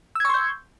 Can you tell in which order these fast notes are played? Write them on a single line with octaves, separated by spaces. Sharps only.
E6 G#6 C#6 C6 G6